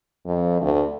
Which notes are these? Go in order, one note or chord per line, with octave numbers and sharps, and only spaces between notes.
F2
D2